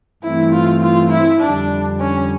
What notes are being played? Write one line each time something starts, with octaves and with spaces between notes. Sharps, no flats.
G2 E3 A3 C4 E4
F4
F4
E4
F2 D3 G3 D4
C#4